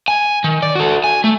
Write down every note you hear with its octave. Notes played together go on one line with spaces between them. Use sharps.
G#5
D#3
D5
F#4 A4
G#5
A3